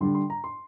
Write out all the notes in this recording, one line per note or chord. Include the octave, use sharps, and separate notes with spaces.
D3 G3 D4 C6
C6
A#5
C6